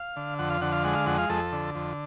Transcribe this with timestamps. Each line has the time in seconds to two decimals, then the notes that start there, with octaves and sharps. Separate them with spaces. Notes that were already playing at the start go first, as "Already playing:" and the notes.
Already playing: F5
0.16 D3
0.39 F2 F#5
0.50 F5
0.61 D3 F#5
0.73 F5
0.84 G#3 F#5
0.95 F5
1.06 F2 F#5
1.18 F5
1.29 F2 A4
1.52 D3
1.75 F2